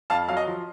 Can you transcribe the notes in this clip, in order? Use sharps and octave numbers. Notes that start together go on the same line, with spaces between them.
F2 F5 A5
F#3 F5
D#5
F3